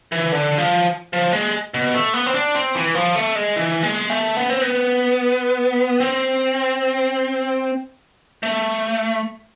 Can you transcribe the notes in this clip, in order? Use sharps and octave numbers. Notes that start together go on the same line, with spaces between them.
E3
D3
F3
F3
G#3
B2
A3
B3
C4
D4
C4
E3
F3
A3
G#3
E3
G#3
A3
B3
C4
B3
C4
A3